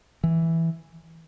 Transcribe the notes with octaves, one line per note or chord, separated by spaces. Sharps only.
E3